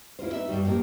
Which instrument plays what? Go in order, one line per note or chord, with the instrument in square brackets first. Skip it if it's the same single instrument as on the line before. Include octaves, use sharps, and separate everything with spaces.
[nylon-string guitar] E4 F4 A#4 C5
D#4 B4 E5
G2 C#3 G3 F#4
F2 A2 A#3 G4 A#4